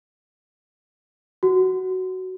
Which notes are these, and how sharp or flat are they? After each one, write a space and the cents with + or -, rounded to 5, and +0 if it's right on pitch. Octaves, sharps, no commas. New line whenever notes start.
F#4 +10